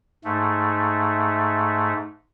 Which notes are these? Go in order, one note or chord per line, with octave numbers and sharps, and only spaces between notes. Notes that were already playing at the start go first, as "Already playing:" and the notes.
G#2 A3